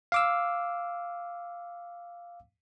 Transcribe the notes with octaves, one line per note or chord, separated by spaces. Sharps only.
F5 D6 E6